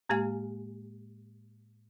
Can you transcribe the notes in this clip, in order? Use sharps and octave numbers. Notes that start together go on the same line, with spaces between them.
A2 G#3 A#3 G4 F5 G#5